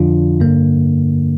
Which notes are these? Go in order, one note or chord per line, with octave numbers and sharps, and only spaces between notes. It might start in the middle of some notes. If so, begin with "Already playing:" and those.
Already playing: F2 D3 F3 D4 F4
G2 D3 A#3